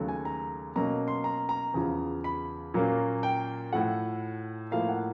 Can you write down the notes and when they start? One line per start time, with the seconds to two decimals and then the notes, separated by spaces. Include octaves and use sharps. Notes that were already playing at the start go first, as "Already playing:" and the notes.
Already playing: D#2 C#3 F#3 A3
0.08 G#5
0.25 A#5
0.76 B2 F#3 A#3 C#4 A#5
1.08 C6
1.24 A#5
1.49 A#5
1.74 E2 C#3 F3
2.24 B5
2.74 A#2 F#3 A#3 C#4
3.23 G5
3.73 A2 F3 A3 F#5
4.72 A2 F3 A#3 F5
4.89 F#5